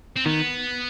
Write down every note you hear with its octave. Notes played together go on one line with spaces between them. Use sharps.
C4
D#3 B3